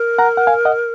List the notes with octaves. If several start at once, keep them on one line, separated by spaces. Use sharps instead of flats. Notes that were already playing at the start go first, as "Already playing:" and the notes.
Already playing: A#4
F#5 A#5
F#5
F5 G#5
D#5 F#5